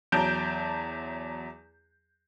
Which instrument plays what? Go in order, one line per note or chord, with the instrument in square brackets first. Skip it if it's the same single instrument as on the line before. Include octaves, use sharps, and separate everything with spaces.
[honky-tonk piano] E2 F#3 A5 A#5 G6 D7